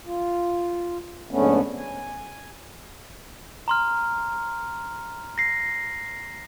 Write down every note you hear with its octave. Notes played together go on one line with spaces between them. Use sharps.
F4
F2 G#2 D3 A3 B3 C#4
G#5
A#5 C6 F6
A#6 C7